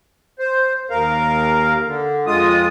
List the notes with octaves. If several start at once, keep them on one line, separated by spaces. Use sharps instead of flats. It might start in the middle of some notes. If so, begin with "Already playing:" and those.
C5
D#2 A#4 F5
D3
F2 G#3 F4 D#6